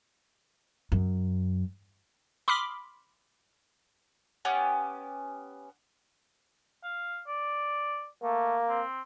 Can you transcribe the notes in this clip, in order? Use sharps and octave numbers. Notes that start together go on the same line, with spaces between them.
F#2
B5 C6 D6 D#6 F6 B6
B3 C#4 G4
F5
D5
A3 A#3
C4